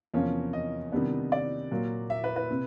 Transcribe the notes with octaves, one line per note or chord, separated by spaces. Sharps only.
E2 C3 F3 A#3 C#4
D#5
C3 D#3 G3 B3 D4
D5
A#2 F#3 A#3
E5
B4
B4
C3